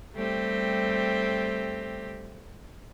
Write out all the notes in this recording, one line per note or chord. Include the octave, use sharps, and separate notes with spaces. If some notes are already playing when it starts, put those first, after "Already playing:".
G3 A3 C4 G4